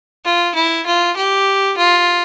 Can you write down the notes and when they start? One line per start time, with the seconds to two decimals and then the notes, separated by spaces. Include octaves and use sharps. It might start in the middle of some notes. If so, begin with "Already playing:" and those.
0.25 F4
0.55 E4
0.86 F4
1.17 G4
1.77 F4